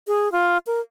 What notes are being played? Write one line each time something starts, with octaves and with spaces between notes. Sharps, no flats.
G#4
F4
A#4